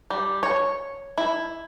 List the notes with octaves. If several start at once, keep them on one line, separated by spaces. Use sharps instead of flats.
G3
C#5
E4